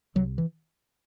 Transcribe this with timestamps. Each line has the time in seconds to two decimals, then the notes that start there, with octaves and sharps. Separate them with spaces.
0.15 C2 C3 F#3
0.38 E3